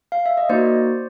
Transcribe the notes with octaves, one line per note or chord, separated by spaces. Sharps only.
F5
E5
D#5
A#3 D#4 F#4 C5 D5